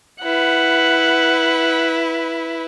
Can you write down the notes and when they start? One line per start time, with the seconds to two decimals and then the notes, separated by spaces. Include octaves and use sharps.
0.23 E4 B4 F#5